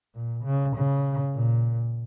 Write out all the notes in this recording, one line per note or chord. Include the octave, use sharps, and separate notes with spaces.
A#2
C#3
C#3
A#2